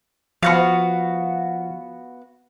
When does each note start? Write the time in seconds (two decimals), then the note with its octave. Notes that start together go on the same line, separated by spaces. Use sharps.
0.43 F3 B3 F#4 F5